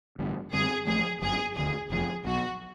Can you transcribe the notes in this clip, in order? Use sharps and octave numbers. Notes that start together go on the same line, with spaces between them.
A1 G2 D3
F#2 D3 G3 C4 G#4
A1 A2 F3 A3 G#4
G1 F#2 D3 G#4
E1 D2 D3 G#4
F1 E2 C3 F3 G#4
B1 B2 F#3 F#4